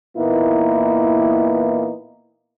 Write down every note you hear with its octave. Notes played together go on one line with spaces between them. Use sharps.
A#2 E3 A#3 B3 D#4 E4